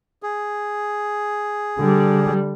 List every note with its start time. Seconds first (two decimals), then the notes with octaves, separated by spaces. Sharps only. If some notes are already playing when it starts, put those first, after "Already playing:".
0.23 G#4
1.79 D3 G3